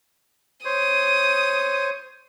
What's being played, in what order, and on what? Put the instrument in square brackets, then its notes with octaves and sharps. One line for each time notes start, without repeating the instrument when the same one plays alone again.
[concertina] C5 C#5 [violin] D#6